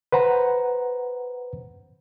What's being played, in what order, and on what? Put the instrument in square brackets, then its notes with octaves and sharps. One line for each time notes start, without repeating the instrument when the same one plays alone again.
[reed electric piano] B4 C5 F#5 A#5